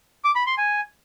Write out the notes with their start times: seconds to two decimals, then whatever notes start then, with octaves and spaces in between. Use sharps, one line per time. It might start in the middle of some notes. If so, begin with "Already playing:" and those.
0.24 D6
0.35 B5
0.47 C6
0.58 G#5